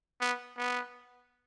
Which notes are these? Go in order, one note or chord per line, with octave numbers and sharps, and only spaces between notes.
B3
B3